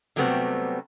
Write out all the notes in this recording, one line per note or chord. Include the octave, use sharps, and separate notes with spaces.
C3 F#3 G3 A3 B3 C4